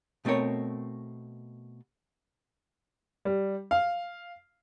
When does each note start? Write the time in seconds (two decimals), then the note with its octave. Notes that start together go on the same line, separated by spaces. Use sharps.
0.25 B2 A3 C4 A#4 C#5
3.25 G3
3.71 F5